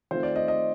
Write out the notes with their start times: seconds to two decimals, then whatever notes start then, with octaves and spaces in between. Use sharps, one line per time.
0.11 D#3 A3 C4 F4 C5
0.23 D5
0.36 D#5
0.48 D#5